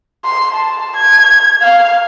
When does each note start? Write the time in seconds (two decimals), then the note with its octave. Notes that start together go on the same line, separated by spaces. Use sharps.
0.25 C6
0.55 A5
0.96 G#6
1.62 F5